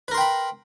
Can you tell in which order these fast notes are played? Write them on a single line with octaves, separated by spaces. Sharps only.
B4 A#4 C6 G5 B5